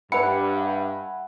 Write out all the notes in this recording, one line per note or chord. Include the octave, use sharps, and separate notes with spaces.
G2 B4 E5 F#5 G#5 B5 C#7